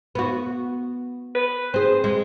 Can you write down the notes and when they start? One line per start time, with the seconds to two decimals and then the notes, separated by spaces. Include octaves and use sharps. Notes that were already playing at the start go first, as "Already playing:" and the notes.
0.15 B3 F#4
1.35 B4
1.74 C4 G#4 C5
2.04 G#3